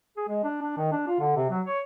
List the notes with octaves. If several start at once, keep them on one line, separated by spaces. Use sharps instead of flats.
G#4
G#3
D4
D4
D#3
D4
F4
D3
C3
F#3
C#5